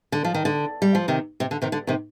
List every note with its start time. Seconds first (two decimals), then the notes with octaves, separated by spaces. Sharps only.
0.12 D3
0.24 F3
0.34 D#3
0.45 D3
0.82 G3
0.95 F3
1.08 C3 D#3
1.40 C3
1.51 D3
1.62 C3 D#3
1.72 D3
1.87 C3 D#3